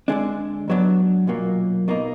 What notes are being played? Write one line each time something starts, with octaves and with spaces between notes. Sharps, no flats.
D2 D3 G#3 D4
G#2 F#3 B3 D4
B1 A#2 F#3 A#3
B2 A#3 D#4